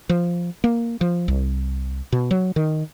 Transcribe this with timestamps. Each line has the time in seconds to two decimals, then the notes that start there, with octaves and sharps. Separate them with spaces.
0.09 F3
0.64 A#3
1.01 F3
1.28 C2
2.12 B2
2.31 F#3
2.56 D#3